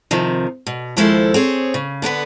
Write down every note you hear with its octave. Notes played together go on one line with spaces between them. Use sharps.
F2 C3 D#3 F3
B2
D#2 F3 G#3 E4 A4 C5
C4 G#4 C#5
C#3
D3 B3 A#4 B4